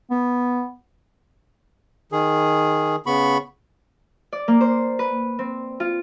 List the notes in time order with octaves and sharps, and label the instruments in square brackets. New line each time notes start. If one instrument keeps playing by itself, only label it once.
[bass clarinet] B3
[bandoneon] D#3 G#4
C#3 B3 B5 C#6
[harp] D5
A#3
C5
B4
C4
F4